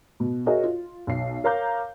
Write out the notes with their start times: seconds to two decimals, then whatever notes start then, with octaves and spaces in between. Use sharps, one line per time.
0.20 B2
0.46 F#4 G#4 A#4 C#5 D#5 E5
0.63 F4
1.07 B1 C7
1.44 A#4 C#5 F5 A#5 D6 G6